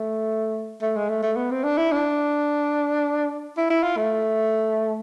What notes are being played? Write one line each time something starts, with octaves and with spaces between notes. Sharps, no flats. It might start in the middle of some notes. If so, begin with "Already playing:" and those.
Already playing: A3
A3
G#3
A3
A3
B3
C4
D4
E4
D4
E4
E4
F4
A3